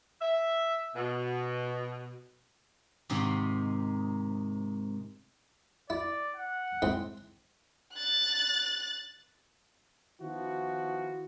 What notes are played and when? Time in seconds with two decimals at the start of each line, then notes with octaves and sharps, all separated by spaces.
0.21 E5
0.95 B2
3.10 G#2 C3 D#3 C4 D#4
5.90 E4 D5
6.36 F#5
6.82 G#2 C4 E4
7.95 F#6 A6
10.21 D#3 F3 B3 E4 F#4